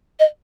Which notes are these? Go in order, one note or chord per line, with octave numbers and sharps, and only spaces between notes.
D#5